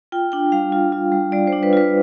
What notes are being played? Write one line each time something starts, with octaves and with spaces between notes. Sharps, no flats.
F4 G5
D4 G5
G3 F5
F4
F4
G3
G3 D5
C5
D4
B4
F4 B4